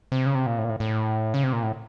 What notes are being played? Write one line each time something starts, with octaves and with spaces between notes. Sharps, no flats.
C3
C#3
C3
A#2
A2
A#2
A2
A2
C#3
C3
A#2
A2